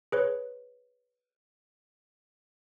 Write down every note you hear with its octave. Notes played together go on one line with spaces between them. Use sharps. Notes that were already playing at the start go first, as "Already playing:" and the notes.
G#4 B4 C#5